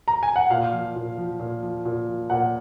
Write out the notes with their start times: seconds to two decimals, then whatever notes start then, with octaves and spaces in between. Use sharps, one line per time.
0.08 A#5
0.23 G#5
0.36 F#5
0.50 A#2 F5
0.73 F3
0.96 A#2
1.18 F3
1.40 A#2
1.63 F3
1.85 A#2
2.08 F3
2.30 A#2 F#5